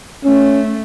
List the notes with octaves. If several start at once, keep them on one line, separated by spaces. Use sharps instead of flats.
A3 C#4